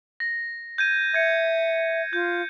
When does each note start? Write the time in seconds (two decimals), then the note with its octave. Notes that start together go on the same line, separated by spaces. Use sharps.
0.20 A#6
0.78 G6 G#6 D#7
1.14 E5 G#6 C#7
2.13 F4 G6